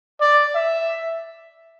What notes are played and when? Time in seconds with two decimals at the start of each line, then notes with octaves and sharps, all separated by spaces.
0.21 D5
0.55 E5